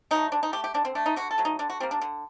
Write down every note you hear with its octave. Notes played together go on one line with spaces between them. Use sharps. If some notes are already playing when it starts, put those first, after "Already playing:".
D#3 F#3 A3 D#4
D3 D4
D#4
A3 G4
G4
D3 D4
C4
A3 D4
D#4
D3 F#4
A4
F#3 A3
D#4
D3 D4
F#4
G3 A#3 C4
D4
D3